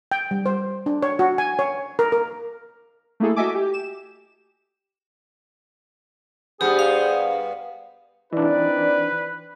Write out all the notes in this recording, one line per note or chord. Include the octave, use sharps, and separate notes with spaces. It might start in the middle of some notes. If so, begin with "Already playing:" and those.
G5
G3
C5
D4
C#5
F#4
G#5
C#5
A#4
A#4
A3 A#3 E4 G#4 A4
F#4 A4 D#5 E5 G#5 D6
G4
E7
G2 B3 G4 G#4 C5
F5
E3 C4 D4 D#4 B4 D5